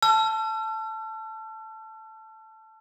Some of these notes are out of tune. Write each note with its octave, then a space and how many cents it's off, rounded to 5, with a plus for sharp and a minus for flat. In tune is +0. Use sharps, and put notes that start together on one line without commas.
A5 +0 E6 +45